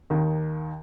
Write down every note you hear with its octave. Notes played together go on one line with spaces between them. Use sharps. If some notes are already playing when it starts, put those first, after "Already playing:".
D#2 D#3